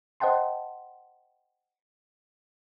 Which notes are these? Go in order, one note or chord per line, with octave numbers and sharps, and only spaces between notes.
C5 D#5 F#5 G5 A5 C6